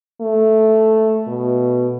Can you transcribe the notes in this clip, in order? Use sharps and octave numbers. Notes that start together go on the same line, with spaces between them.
A3
B2